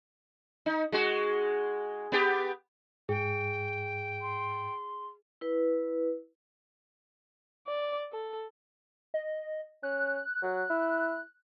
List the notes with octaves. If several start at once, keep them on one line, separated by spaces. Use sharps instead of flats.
D#4
G#3 F#4
B3 G4
G#2 G#4 G5
C6
E4 B4
D5
A4
D#5
C#4 F#6
F#3
E4